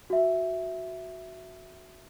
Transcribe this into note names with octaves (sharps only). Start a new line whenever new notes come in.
F#4 E5